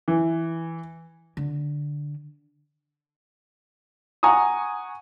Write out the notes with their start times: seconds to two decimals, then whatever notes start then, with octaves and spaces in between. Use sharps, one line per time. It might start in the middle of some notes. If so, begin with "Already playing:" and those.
0.08 E3
1.37 D3
4.23 F#5 G#5 A#5 C#6 D#6